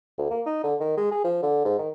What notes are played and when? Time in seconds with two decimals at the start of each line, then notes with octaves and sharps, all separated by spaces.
0.18 D2
0.30 A#3
0.46 D#4
0.64 D3
0.80 D#3
0.97 G#3
1.11 G#4
1.24 F3
1.42 D3
1.65 G#2
1.79 D#3